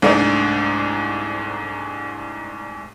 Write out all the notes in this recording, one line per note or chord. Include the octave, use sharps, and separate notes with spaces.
C2 G#2 A3 D4 D#4 D5